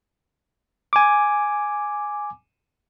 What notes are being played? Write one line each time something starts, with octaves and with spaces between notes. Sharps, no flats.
G#5 D6